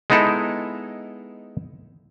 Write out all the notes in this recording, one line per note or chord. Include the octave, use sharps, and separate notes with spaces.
G#3 B3 D#4 E4 A4